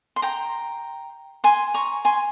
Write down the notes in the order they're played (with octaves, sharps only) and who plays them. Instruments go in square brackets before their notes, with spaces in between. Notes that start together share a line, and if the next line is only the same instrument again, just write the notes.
[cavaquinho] C6
G5 A#5
G#5 C6
A#5 C#6
G#5 C6